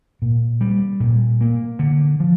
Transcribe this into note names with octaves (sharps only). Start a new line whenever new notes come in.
A#2
G3
A#2
A#3
D3
F3